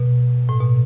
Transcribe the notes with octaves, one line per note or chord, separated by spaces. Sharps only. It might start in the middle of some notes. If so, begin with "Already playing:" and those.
Already playing: B2
A2
B2